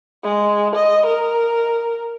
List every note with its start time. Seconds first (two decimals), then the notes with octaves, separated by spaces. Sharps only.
0.24 G#3
0.75 D#5
1.06 A#4